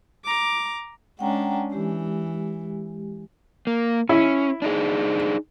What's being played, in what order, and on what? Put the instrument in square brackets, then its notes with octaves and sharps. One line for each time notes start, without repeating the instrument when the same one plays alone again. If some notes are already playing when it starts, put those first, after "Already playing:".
[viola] A#5 D6
[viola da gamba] G#3 C#4 D4 [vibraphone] F#5 G5 A#5
[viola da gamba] E3 [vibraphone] G#3 G4
[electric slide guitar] A#3
[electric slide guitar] C#4 [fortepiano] E4
[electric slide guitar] D4 D#4 G#4